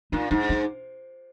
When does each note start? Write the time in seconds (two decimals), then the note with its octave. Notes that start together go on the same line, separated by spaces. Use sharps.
0.12 A#2 D#4
0.31 G#2 D#4
0.49 D#4